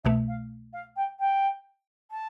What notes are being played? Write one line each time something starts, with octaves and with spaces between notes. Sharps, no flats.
C2 B2 A3 E5
F5
F5
G5
G5
A5